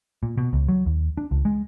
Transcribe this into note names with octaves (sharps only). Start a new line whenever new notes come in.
A#2
B2
C#2
F#3
D#2
D4
C#2
G#3